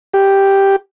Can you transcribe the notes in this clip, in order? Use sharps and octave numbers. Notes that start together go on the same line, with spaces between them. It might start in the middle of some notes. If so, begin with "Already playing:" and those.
G4